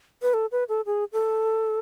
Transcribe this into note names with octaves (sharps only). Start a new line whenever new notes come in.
B4
A4
B4
A4
G#4
A4